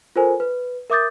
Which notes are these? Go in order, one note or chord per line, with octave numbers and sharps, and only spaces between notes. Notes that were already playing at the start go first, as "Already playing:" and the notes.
F4 A4 A#4 C5 G#5
B4
A#4 E5 D6 D#6 G6 A6